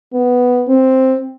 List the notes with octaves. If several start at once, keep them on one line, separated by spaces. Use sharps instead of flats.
B3
C4